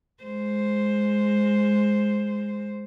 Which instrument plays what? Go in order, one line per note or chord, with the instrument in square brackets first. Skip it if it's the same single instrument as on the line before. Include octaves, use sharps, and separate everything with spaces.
[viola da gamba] G#3 C5